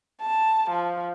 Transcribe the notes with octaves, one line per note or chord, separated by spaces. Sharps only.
A5
F3